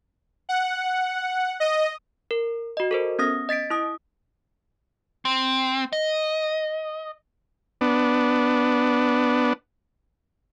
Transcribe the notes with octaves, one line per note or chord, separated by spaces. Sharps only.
F#5
D#5
A#4
F#4 D#5
A4 A#4 C5
B3 C#4 D#6 A#6
D#5 A6 B6 D7
E4 D#6
C4
D#5
B3 D4